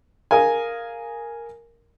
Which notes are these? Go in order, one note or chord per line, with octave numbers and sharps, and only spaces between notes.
G#4 A#4 F5 G#5